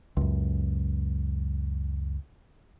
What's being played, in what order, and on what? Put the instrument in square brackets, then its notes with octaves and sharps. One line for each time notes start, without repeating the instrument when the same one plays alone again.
[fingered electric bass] C#2 F#2